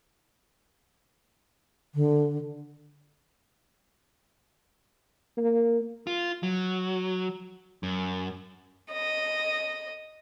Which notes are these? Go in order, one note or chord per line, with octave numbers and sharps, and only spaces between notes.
D3
A#3
F4
F#3
F#2
D#5